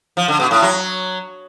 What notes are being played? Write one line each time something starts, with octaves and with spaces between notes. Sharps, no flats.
F3
D3
B2
A2
F#3